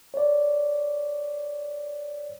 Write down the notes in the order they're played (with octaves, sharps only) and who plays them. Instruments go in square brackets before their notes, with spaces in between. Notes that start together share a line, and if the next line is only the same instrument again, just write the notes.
[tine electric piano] C#5 D5